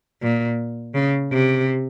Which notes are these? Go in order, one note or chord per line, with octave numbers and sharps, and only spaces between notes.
A#2
C#3
C3